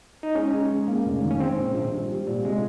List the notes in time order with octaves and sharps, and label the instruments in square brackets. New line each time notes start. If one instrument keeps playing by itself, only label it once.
[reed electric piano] D#4
[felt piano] G#3 [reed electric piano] C#4
[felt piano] G#3
G#3
A#3
F1
D#3
[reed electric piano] C#4
[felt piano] G#3 [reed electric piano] C4
[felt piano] A#1
A#1
G3
G3
A#2
[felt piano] C3 [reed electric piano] G#3